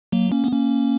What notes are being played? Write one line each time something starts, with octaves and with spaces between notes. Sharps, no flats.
F#3 A#3
A#3 C#4
B3
A#3 C#4